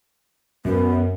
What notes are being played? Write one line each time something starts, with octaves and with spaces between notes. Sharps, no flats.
F#2 B3